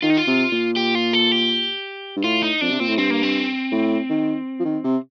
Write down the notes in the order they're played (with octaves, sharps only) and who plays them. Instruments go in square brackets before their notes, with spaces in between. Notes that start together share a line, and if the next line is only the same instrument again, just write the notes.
[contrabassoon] D#3 [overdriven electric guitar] F4
[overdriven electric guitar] D#4
F4
[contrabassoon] C3
A#2
[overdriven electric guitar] G4
F4
A4
G4
[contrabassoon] G2
[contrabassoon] A2 [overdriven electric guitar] F4
[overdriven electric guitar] D#4
[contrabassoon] F2 [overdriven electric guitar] D4
[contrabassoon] C3
[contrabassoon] A#2 [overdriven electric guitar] C4
[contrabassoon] A2
[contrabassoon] G2 [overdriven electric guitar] C4
[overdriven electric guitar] A#3
C4
[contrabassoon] A2
D#3
F3
D#3
C3